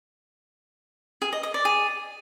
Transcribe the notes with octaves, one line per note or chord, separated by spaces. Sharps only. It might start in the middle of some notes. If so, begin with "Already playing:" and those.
G#4
D#5
D#5
D5
G#4